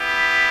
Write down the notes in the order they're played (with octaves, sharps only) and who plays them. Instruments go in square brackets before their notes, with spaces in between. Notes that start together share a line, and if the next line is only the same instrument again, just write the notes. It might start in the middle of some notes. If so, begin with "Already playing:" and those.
Already playing: [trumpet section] B3 E4 G4